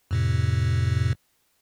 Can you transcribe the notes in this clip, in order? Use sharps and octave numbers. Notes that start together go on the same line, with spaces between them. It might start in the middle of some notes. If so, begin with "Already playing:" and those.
F2 A2 C3